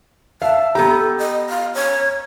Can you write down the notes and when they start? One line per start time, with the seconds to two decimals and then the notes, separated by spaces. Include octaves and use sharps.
0.42 E5 F5 A5
0.75 B3 G4 A4 A#5
1.18 D#5
1.49 F5
1.74 C#5